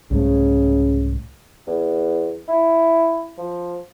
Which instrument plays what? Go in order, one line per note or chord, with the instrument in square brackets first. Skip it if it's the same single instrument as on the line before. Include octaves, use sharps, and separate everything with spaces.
[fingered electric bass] C2 G#2 A3 [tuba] C#3
[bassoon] E2
E4
F3